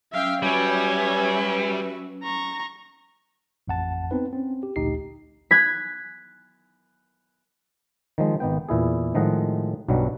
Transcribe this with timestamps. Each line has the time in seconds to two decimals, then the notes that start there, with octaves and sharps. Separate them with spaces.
0.13 F#3 C#4 E5 F5 G5
0.42 G3 F#4 B4 C#5 E5 G#5
2.23 A#5 C#6
3.68 A1 F2 F#5 A5
4.11 B3 C4 D#4 B4
4.33 C4 C#4
4.63 G4
4.76 A1 D2 A#2 D#4 G4 C7
5.51 F#6 G#6 B6
8.18 D#3 F3 G#3 D#4
8.40 G#1 D#3 B3 G5
8.69 E2 A#2 E4 G#4
9.14 A2 D#3 F3 G#3 D#5 F#5
9.88 B1 G2 B2 F#3 G3